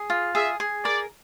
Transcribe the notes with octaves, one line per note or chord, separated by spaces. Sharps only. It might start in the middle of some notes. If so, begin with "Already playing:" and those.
Already playing: G#4
F4
G#4 E5
G#4
A#4 D5